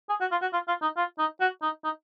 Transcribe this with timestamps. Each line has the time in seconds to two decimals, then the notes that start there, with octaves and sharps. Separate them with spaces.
0.09 G#4
0.21 F#4
0.31 F4
0.42 F#4
0.53 F4
0.68 F4
0.82 D#4
0.96 F4
1.18 D#4
1.40 F#4
1.62 D#4
1.84 D#4